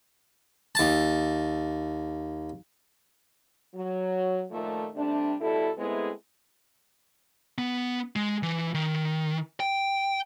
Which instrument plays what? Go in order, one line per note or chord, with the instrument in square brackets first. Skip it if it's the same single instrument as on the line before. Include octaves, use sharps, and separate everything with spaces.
[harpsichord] D#2 A5
[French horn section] F#3
A#2 D#3 F3 A3
C3 G3 A3 D4
B2 G3 E4 A4
G#3 A3 B3 C4 E4 G#4
[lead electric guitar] B3
G#3
E3
D#3
G5